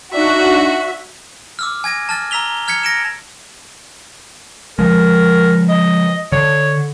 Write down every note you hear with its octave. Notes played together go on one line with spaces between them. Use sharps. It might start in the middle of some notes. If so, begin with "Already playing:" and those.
D4 D#4 F#4 E5
D6 E6 F6
G#5 G#6 A#6 D#7
A5 F6 A6
A#5 E6 B6 F7 G7
F6 G#6 B6 C#7
A#6 D7 E7
F3 G#3 A#4
D#5
D3 C#5